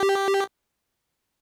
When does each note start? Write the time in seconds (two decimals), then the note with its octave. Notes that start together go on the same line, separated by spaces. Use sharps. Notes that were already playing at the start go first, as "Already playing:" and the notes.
Already playing: G4